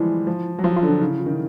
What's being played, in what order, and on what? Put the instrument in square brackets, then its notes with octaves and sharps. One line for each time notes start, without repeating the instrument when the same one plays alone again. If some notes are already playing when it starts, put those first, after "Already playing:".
Already playing: [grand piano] E3 F3 G3 G#3 [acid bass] E4
[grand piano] F3
F#3
[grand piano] F3 [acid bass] F4
[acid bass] F4
[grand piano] D3
[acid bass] D4
[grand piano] C#3 [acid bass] D#4
[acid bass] E4
F4
[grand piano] D#3 [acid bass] E4